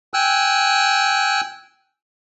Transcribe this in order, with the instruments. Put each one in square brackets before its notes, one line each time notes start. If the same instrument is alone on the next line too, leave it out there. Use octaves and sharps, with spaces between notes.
[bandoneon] G5 G#5 E6 F#6